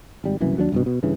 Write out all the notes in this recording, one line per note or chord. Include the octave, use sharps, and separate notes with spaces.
G#1 G3
F#1 C2 F#2 E3
D#2 F#3 G#3 D4
C2 G2 B2
B2
G2 C#3 E3